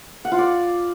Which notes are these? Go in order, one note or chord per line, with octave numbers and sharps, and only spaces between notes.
F#5
F4
D5